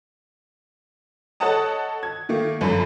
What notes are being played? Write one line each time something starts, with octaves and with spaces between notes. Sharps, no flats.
A4 C#5 D#5 F#5 A5 D#6
G#6
D#3 A3 A#3
G1 F#2 F3 A4 B5